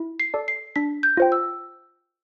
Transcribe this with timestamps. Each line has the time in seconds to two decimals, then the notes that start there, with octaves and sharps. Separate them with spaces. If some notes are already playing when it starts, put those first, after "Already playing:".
Already playing: E4
0.20 C7
0.34 A4 D5 A5
0.48 C7
0.76 D4 B6
1.03 G6
1.17 F4 C5 G5
1.32 E6